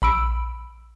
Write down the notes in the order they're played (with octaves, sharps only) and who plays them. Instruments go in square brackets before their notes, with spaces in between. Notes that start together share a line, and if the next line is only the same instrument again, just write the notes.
[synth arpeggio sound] A#1 B5 E6 D7